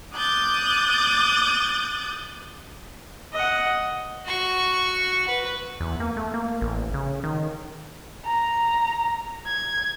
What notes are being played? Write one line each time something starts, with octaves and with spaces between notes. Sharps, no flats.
D6 D#6 F#6 G6 A6
D#5 F#5
F#4 C#6
B4
E2
A#3
A3
A#3
A1
C#3
D#3
A#5
G#6